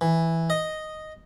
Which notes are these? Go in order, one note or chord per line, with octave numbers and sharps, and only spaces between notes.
E3
D#5